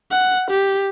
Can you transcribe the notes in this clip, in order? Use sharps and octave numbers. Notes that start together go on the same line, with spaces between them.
F#5
G4